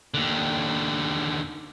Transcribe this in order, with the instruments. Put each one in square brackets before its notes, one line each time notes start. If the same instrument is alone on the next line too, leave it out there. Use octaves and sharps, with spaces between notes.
[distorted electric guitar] D#2 D3